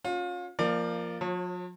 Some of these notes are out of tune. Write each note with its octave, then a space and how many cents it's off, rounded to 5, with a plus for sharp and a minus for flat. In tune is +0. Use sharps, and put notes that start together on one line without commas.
C#4 +0 F4 +35
F3 -10 A#3 +0 D5 +25
F3 +45 C#5 -25